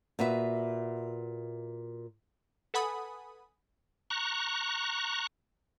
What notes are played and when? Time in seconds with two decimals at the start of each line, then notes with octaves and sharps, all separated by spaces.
0.19 A#2 F#4 B4 E5
2.74 A4 B4 F#5 G#5 B5 D#6
4.10 A#5 C#6 F#6